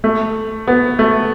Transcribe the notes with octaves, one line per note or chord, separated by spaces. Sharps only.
A3
B3
A3